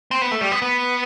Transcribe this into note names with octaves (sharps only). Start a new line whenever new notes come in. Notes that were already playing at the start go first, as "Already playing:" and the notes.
C4
B3
A3
G3
B3
B3